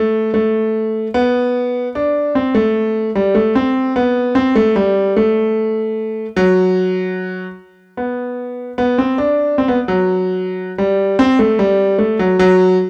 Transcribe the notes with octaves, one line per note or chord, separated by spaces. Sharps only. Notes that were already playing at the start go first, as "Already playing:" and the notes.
Already playing: A3
A3
B3
D4
C4
A3
G3
A3
C4
B3
C4
A3
G3
A3
F#3
B3
B3
C4
D4
C4
B3
F#3
G3
C4
A3
G3
A3
F#3
F#3